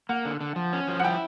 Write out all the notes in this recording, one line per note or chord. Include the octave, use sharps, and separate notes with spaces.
A#3 F#5
D3
D3
F3
C#4
F3
F#5
E4 G5